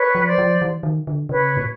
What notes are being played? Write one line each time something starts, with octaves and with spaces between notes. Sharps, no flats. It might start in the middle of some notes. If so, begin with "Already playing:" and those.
Already playing: B4 C#5
F3
C5 D5
F3
E3
D#3
D3
C#3 B4 C#5
A2